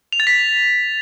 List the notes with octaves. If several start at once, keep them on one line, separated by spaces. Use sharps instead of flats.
F7
A6
B6